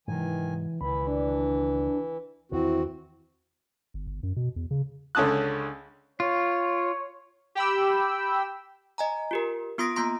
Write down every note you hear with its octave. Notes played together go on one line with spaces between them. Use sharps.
G#2 C3 D#3 E3 F#3 G#5
C#2 D#3 E3 B5
D4
E2 D#3 E3 C4 E4 F#4
G1
G1
F#2
B2
E2
C#3
C#2 D3 C#4 A5 D#6 F#6
F4 C#5
G4 G5 B5 E6
D#5 G#5 A#5
F4 G4 A#4
B3 F4 C6 D#6 A#6 D7
A#3 F4 A#5 C6 A#6